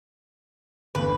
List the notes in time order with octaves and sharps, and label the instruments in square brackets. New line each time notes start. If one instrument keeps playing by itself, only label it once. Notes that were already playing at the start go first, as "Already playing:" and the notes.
[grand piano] G1 E2 [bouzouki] B4